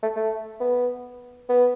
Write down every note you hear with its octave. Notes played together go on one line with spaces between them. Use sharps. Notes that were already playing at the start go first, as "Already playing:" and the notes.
A3
A3
B3
B3